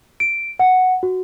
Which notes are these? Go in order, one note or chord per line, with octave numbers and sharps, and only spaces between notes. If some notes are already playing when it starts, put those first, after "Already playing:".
D7
F#5
F#4